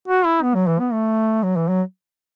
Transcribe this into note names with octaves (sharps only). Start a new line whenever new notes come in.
F#4
E4
B3
F#3
E3
B3
A3
F#3
E3
F#3